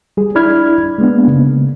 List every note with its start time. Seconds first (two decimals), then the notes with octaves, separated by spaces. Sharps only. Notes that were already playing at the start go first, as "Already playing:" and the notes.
0.17 G3 G#4
0.35 D4 E4 D5 B5 F6 G#6
0.98 G#3 A#3 B3 D4
1.28 C#3